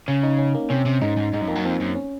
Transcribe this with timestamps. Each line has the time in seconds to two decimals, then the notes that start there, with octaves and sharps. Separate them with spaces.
0.08 C#3 C#4
0.23 D#4
0.38 C#4
0.55 A#3
0.70 C3 C#4
0.86 C3
1.02 G#2 D#4
1.17 G#2
1.33 G#2 D#4
1.41 F#2
1.48 F2 A#3
1.55 F#2
1.65 F2 C4
1.80 F#2
1.95 C#4